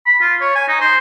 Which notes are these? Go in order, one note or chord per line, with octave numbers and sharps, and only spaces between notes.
B5
F4
C#5
G#5
D#4
C5